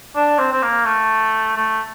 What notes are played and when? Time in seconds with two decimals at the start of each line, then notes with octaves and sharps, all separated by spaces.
0.16 D4
0.39 C4
0.52 C4
0.62 A#3
0.86 A3
1.56 A3